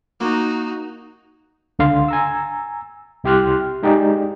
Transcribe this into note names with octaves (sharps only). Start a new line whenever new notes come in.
A#3 D#4 F#4
C#2 D3 F5 C6
G#5 A#5 E6
C2 E4 G4 C6 F6 F#6
G#3 D#4 G4 G#4 D5